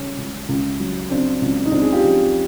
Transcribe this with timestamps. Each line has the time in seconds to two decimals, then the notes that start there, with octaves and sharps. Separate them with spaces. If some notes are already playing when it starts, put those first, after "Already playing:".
Already playing: C#3 G3 C#4
0.18 C#2
0.49 C#2
0.79 F#3
1.10 C#3 C4 D4
1.42 C#2
1.65 D#4
1.72 C#2 C4 D4
1.82 G#4
1.92 F4 G4
2.03 F3